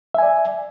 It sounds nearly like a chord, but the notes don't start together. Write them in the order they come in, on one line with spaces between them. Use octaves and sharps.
E5 G#5 D5